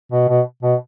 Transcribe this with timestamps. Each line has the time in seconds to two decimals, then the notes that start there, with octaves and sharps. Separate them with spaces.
0.12 B2
0.29 B2
0.63 B2